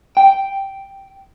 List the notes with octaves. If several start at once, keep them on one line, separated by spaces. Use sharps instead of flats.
G5